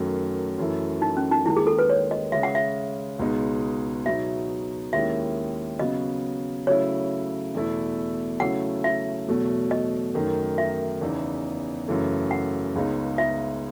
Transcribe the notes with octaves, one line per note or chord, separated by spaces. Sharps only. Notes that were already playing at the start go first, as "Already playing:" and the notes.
Already playing: F#2 D#3 F#3 A3 C#4
F#2 E3 A3 E4
D#4
C#4
D#4
D#2 D#3 G#3 E4
G#4
A4
B4
C#5
D#5
C#3 G#3 C#4 E5
F#5
E5
C#2 B2 G#3 B3 D#4
B2 F#3 B3 D#4 E5
D#2 D#3 G#3 C#4 E4 E5
C#3 F#3 B3 D#5
C#3 F#3 A3 E4 C#5
E2 B2 A3 E4
C#3 F#3 A3 C#4 E4 F#5
E5
E2 B2 F#3 A3
D#5
F#2 D#3 A3 D#4
E5
E2 C#3 E3 B3 D#4
F#2 C#3 E3 A3
F#5
C#2 C#3 G#3 B3 D#4
E5